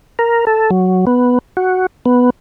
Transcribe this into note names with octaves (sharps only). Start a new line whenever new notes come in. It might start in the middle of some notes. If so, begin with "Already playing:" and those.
A#4
A4
F#3
B3
F#4
B3